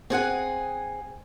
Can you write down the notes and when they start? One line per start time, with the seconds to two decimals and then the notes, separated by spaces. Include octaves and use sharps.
0.10 C4 G#4 F#5 G#5